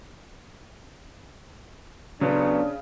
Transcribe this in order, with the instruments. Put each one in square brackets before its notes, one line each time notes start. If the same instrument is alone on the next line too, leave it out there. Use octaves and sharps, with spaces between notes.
[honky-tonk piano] C#3 [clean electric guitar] F#3 B3 [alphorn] D4